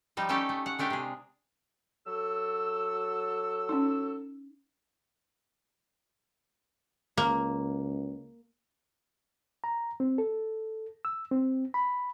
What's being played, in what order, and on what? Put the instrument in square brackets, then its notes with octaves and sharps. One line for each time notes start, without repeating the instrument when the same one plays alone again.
[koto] F3 G3 D#4
A3 C#4 D#4 G4 A4
A3
F#5
G#3 A3 D4 G4 A#4
C3 G#4
[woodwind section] F#3 A4 E6
[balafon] C#4 D#4
[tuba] C#2 [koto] A#3
[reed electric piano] A#5
C4
A4
E6
C4
B5